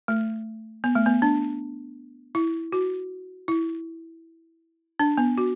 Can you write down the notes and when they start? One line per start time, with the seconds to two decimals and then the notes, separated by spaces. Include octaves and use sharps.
0.08 A3
0.84 B3
0.95 A3
1.06 B3
1.22 D4
2.35 E4
2.72 F#4
3.48 E4
5.00 D4
5.18 B3
5.38 F#4